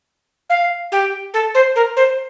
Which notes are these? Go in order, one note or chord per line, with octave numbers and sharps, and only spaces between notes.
F5
G4
A4
C5
A#4
C5